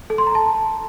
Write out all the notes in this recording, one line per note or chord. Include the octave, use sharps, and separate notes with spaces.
A4
C6
A#5
A5